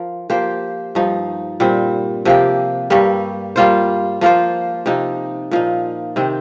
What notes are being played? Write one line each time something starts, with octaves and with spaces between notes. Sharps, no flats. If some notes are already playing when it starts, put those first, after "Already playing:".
Already playing: F3 F4 A#4
F3 A#3 G4 C5
G2 F3 D#4
A#2 G3 C4
C3 F3 A#3 G4
G2 G3 A#3
G3 A#3 F4 C5
F3 A#3 F4 C5
C3 F3 D#4
A#2 F3 D#4
C3 D#3 C4